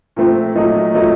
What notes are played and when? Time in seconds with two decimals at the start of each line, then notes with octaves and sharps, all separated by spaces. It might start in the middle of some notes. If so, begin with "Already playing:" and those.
0.16 A#2 F3 A3 C4
0.56 A#2 F#3 A3 D#4
0.94 A#2 F#3 A3 D#4